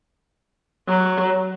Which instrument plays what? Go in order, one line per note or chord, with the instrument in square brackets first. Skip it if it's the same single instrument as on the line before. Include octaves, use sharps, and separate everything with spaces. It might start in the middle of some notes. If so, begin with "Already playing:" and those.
[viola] F#3